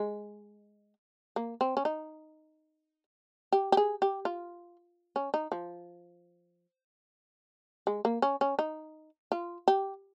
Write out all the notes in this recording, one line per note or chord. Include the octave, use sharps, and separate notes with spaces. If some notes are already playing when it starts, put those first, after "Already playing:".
Already playing: G#3
A#3
C4
C#4
D#4
G4
G4
G#4
G4
F4
C#4
D#4
F3
G#3
A#3
C#4
C#4
D#4
F4
G4